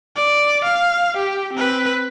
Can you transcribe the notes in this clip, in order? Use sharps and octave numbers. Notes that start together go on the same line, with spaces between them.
D5
F5
G4
C4 B4